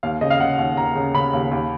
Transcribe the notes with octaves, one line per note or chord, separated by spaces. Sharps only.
D#2 F5
C#3 D#5
F5
C#3 F#5
D#2
D#2 A#5
C#3
C#3 B5
D#2
D#2